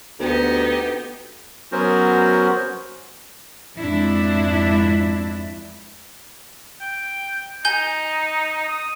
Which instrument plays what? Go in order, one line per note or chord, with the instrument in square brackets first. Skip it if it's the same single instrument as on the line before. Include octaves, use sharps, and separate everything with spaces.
[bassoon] D2 [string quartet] B3 D#4 G4
[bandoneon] F#3 B3 C#4 F#4 A#4 C5
[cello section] F2 G#2 D4 E4
[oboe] G5
[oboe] D#4 [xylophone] G#5 G6 G7
[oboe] D#6